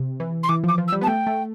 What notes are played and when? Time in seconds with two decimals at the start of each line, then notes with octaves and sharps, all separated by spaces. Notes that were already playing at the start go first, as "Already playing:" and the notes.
Already playing: C3
0.20 E3
0.43 C6
0.49 E3 D6
0.64 F3 D6
0.78 F3
0.88 E6
0.92 G3
1.01 B3 A5
1.07 A3 G5
1.27 A3